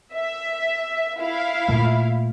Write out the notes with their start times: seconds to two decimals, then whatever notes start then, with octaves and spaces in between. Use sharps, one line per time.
0.15 E5
1.19 E4 F5
1.68 A#2 A3